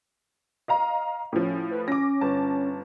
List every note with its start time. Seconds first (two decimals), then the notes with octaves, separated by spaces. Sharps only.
0.68 D#5 F5 A#5
1.33 A2 F3 C#4
1.71 B4
1.88 C#4 D6 A#6
2.21 G1 A5